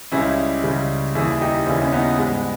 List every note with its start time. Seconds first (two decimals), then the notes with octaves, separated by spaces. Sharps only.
0.12 C#2 C#3 G3 C#4 E4
0.64 C#2 C#3 G3
1.15 D#2 C#3 E3 G3 E4 G#4
1.41 D#4 G4
1.66 D#2 C#3 E3 G3 C#4 E4
1.82 C#4
1.92 B3 D#4
2.19 G#2 G3 G#3 B3